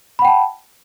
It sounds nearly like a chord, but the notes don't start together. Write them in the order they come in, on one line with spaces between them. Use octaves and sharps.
B5 F#5 G5 A5